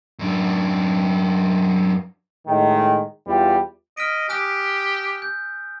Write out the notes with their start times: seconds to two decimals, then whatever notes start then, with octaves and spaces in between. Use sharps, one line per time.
0.19 F#2 D4
2.48 A2 D#3 G#3
3.27 E2 G3 F4
3.97 D#5 F6 B6 D7
4.29 G4 G#5 D#6 F#6
5.22 G6